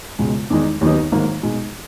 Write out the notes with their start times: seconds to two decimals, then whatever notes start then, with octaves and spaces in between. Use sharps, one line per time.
0.19 C#2 B2 G#3
0.50 E2 D#3 G#3 D#4
0.81 D#2 D#3 F#3 B3 D#4
1.12 G#2 D#3 F#3 A#3
1.43 B2 G#3 D#4 F#4